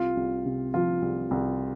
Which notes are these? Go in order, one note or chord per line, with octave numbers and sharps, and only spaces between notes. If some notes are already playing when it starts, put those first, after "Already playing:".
Already playing: C2 F4
C2
C3
F3 F4
C2
C2